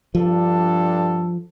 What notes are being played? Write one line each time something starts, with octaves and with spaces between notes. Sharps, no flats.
G2 F3 D4 A4